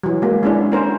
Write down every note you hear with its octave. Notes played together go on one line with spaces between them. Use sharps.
E3 F#3
G#3 A#3
G#3 C#4 D4 E4
C#4 A#4 C5